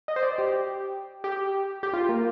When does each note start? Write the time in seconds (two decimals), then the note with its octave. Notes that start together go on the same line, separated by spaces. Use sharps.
0.08 D#5
0.16 C5
0.23 D5
0.38 G4
1.24 G4
1.83 G4
1.93 F4
2.09 A#3